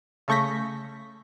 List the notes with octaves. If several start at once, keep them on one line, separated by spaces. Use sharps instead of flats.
C#3 A3 C#6 G6 A#6 B6